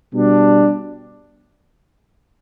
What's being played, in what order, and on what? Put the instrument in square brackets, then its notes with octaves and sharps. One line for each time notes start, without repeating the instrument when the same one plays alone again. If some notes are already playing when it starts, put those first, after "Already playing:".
[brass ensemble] B2 G3 D4